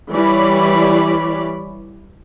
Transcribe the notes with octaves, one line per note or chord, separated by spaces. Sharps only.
E3 G3 C#5 D5 B5